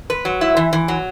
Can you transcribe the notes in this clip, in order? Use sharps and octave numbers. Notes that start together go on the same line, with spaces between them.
B4
F#3
E4
E3
E3
F#3